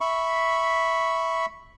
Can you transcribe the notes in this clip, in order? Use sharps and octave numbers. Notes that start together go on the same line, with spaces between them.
E5 B5 C#6